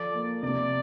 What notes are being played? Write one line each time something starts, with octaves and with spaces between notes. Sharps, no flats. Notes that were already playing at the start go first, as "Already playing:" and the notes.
Already playing: F3 A4 D5
A#3
C3 D5